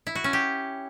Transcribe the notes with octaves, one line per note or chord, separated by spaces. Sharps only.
E4
F#4
C#4
G4